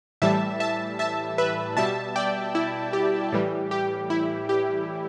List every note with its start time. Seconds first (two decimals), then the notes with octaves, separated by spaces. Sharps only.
0.22 A2 E3 G3 E5 A5
0.60 E5 A5
0.99 E5 A5
1.38 B4 E5
1.77 B2 G3 E5 A5
2.16 D5 G5
2.55 E4
2.93 G4
3.32 A2 E3 G3
3.71 G4
4.10 E4
4.49 G4